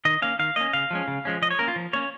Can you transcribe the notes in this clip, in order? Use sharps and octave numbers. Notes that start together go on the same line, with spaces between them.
D#3 D#5
A#3 C#4 F5
D#3 F5
A#3 C#4 D#5
C#3 F5
F3 G#3 C#4
C#3
F3 G#3 C#4
F3 D#5
C#5
A#3 C#4 A#4
F4
F3
A#3 C#4 C#5